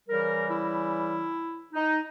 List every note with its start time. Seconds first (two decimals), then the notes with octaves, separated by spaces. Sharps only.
0.09 C#3 E3 G3 A#4
0.50 E4
1.74 D#4